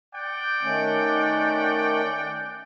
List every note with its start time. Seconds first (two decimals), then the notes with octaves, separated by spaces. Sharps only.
0.14 D5 F#5 G5
0.63 D#3 A3 C#4